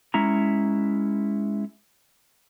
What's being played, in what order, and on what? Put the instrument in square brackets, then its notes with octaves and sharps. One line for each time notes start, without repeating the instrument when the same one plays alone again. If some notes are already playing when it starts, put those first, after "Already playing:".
[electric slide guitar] G#3 C#4 E4 A#5